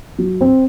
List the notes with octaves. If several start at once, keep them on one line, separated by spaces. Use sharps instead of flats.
F#3
C4